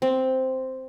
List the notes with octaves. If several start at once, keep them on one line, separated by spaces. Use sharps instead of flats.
C4